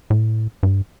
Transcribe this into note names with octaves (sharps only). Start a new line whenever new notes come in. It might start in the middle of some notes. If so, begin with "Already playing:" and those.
A2
G2